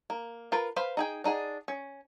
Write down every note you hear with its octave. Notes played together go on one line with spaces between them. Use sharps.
A#3
F4 A#4 B4
B4 C5 F5 B5
D#4 G#4 G5
D4 D#4 G#4 F#5
C#4